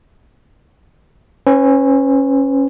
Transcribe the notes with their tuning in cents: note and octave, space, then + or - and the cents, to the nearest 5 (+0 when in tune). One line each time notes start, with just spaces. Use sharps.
C#4 -15 B4 +35